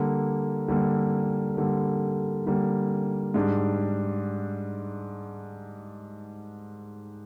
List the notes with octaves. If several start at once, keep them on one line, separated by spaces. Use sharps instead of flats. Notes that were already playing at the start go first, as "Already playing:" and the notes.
Already playing: D3 G3 A#3
D3 G3 A#3
D3 G3 A#3
D3 G3 A#3
G#2 G3 D4